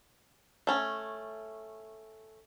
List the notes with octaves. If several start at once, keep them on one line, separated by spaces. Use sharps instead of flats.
A3 C#4